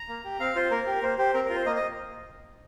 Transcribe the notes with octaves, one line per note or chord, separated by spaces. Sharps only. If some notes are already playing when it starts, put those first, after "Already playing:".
Already playing: A#5
A#3
G4
C4 F5
F4 C5
A#3 A#4
G4
A#3 C5
G4 C5
C4 A#4
F4 A#4
C5
A#3 D#5
D#5